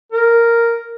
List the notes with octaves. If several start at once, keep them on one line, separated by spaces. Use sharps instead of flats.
A#4